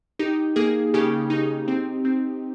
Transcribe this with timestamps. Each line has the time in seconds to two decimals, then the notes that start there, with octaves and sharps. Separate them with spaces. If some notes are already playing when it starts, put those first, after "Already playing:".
0.19 D#4 G4
0.56 A#3 G#4
0.94 C#3 G4
1.30 D#4
1.68 C4
2.05 C4